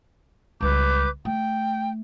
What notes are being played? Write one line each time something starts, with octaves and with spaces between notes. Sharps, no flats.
C#2 G3 B4 D6 G6
A3 G5